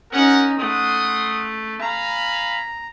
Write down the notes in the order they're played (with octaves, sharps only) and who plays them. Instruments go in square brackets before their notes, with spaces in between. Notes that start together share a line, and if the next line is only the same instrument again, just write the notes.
[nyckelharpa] C#4 D#4 [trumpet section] F#4 A#4 F#5
[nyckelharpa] A3 [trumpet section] F#5 C6 D#6
[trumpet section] F5 G#5 B5 [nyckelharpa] A#5